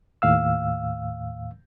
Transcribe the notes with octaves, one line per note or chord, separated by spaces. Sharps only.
D#2 A2 F5 E6